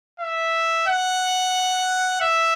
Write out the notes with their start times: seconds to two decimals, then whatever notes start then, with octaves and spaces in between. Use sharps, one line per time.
0.20 E5
0.87 F#5
2.21 E5